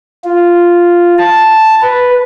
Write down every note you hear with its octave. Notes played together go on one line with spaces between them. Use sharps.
F4
A5
B4